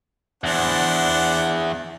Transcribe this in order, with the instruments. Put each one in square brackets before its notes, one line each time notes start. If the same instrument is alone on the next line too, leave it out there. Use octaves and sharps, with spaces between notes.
[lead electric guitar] E2 [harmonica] D4 C5 F#5